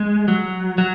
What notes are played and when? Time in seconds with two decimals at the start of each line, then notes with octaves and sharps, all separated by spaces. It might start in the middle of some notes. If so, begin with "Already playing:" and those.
Already playing: G#3
0.28 F#3
0.78 F#3